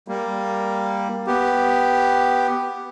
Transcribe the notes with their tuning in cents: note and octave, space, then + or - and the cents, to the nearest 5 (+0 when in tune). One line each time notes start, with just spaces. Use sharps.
G3 +5 A#3 +0
B3 +0 G4 +0